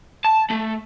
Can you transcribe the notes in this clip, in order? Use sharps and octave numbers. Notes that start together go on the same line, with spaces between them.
A5
A3